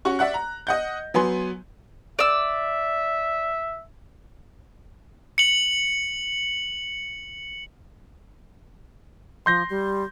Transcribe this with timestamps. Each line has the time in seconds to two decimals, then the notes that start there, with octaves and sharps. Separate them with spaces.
0.05 C#4 F#4 C#6
0.19 D5 E5 F#5 F#6
0.34 A#5
0.67 D#5 F#5 G6
1.14 F#3 B3 G#5 C6
2.19 D5 E5 E6
5.38 C#7 F#7
9.46 F3 C6 G6 A#6
9.70 G3